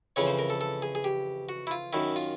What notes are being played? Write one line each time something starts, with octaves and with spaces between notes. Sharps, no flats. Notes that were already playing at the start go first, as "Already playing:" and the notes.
F2 C#3 E3 C#5
C5
A#4
A4
A4
G#4
G#4
G4
F#4
E4
F4
F#2 D#3 E4
F4